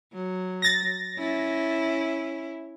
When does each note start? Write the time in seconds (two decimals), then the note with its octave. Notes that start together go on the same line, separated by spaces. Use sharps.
0.13 F#3
0.62 A6 A#6
1.17 C#4 E4